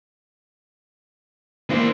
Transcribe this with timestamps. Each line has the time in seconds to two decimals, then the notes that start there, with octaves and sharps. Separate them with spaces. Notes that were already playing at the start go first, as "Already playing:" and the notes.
1.70 E3 A#3 D4 C5